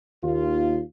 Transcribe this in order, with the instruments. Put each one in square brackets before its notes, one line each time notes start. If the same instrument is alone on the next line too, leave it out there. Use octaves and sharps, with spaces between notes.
[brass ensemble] D#2 F4